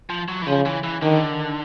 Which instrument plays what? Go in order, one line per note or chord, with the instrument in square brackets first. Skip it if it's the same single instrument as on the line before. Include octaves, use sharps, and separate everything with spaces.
[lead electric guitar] F3
F#3
E3
[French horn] C#3 [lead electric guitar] F3
[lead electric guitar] E3
E3
[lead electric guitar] D3 [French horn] D#3